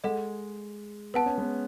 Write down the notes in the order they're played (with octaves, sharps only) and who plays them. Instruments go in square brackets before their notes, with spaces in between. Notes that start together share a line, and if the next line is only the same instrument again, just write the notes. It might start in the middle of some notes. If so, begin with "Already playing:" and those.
[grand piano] G#3 [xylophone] A4 D#5 F#5
[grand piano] B3 [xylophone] B4 F#5 A5
[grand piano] C#4
G#3 B3